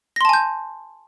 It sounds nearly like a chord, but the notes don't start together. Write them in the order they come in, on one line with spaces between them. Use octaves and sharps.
A#6 C6 A5 G#5 G6